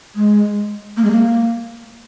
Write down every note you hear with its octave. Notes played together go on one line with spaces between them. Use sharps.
G#3
A#3
G#3
A#3